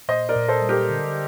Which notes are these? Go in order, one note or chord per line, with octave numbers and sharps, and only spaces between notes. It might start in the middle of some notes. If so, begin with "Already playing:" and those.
A#2 C5 D#5
A#4 D5
A#2
A4 C5
G3
G4 A#4
D3